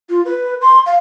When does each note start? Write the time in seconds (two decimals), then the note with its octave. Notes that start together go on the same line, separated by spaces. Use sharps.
0.10 F4
0.25 B4
0.62 C6
0.86 F5